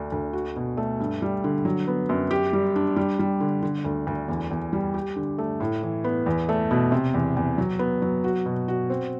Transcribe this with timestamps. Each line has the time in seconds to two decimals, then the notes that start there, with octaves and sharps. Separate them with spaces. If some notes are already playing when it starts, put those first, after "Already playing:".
Already playing: D2 D4
0.12 D2
0.33 F#4
0.56 B2
0.77 A3
1.00 G2
1.22 G3
1.44 D3
1.65 F#3
1.88 B3
2.09 F#2
2.31 G4
2.53 G3
2.76 D4
2.96 G3
3.19 G3
3.40 D3
3.63 D3
3.85 D2
4.07 D2
4.28 E2
4.51 E2
4.73 G3
4.94 G4
5.16 D3
5.38 A3
5.60 A2
5.83 E3
6.04 B3
6.26 E2
6.49 A3
6.71 B2
6.92 C3
7.14 E2
7.36 E2
7.58 F#3
7.79 B3
8.02 F#3
8.24 F#4
8.46 B2
8.68 F#4
8.90 C4